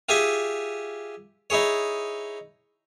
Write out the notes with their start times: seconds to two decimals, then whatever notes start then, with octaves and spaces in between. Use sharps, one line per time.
0.09 F4 G4 G#4 E5 G#5
1.50 D#4 E4 G#4 C#5